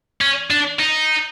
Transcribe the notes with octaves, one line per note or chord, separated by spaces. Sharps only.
C#4
D4
D#4